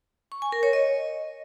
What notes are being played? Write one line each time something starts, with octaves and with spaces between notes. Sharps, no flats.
C#6
G#5
A#4
C#5
D#5